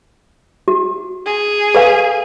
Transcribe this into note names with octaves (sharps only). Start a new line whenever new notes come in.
F#4
G#4
A4 B4 F5